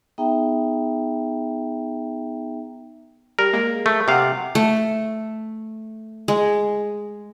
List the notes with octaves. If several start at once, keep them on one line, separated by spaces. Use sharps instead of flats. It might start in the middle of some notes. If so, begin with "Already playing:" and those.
B3 D#4 G#4 E5 G5 A#5
G3 A#4
G#3 A#3
A3
C3 F5 F#5 D6
A3
G#3